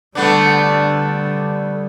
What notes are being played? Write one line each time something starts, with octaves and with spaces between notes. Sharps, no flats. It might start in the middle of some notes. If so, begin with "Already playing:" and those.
D3 G3 A3 B3 D4